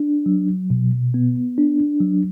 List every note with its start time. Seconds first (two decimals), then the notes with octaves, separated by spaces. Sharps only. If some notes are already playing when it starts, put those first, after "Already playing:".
Already playing: D4
0.26 F#3
0.70 B2
1.14 B3
1.58 D4
2.00 F#3